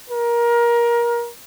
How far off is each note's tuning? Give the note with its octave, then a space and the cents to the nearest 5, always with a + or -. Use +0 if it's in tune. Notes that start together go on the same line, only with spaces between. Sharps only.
A#4 +25